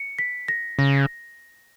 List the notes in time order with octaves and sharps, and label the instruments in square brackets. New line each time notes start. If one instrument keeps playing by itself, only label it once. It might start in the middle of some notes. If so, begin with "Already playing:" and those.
Already playing: [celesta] C#7
B6
A#6
[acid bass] C#3 [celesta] A#6